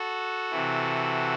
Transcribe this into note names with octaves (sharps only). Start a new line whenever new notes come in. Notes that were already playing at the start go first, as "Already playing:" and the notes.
Already playing: F#4 A4
C3 E3